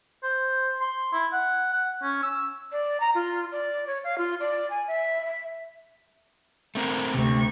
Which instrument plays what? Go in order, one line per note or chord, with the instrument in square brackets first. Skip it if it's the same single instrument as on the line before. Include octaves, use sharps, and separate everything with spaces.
[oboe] C5
C6
E4
F#5
F#5
C#4
E6
[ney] D5
A#5
F4
D5
C#5
F5
F4
D5
G#5
E5
E5
[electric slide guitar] A3 C4 A#4
[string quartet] D2 C#6 [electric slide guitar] C3